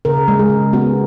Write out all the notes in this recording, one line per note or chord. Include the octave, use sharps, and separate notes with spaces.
C#3 A#4
G#3
G#4
C#3
B3 F#4